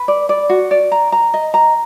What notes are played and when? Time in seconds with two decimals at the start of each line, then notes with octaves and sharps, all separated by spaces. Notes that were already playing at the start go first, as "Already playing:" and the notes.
Already playing: B4
0.08 D5
0.29 D5
0.49 F#4
0.71 D5
0.92 A#5
1.12 A#5
1.34 D#5
1.54 A#5